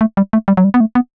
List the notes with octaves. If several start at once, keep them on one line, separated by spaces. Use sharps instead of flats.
A3
G3
A3
G3
F#3
G3
B3
A3
B3